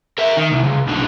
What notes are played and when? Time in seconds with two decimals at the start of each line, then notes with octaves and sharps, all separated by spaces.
0.18 A#4 E5
0.37 D#3
0.52 C2
0.63 C#2
0.87 B1 D3